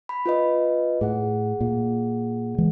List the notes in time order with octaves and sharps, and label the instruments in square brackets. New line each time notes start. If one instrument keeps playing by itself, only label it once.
[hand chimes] B5
F4 B4 D#5
[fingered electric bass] A2 [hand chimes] G#4 F#5
[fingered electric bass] A#2
E3 G#3